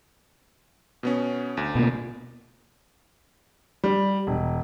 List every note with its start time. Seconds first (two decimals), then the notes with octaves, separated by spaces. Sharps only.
1.03 B2 B3 C#4
1.57 D2
1.75 B2 A#3
3.84 G3
4.27 E1